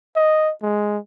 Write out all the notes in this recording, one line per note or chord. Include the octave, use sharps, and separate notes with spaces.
D#5
G#3